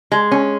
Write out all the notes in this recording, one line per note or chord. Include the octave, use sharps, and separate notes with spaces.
G#3
C#4